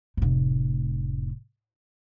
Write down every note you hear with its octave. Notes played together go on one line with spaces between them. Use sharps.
F1 A2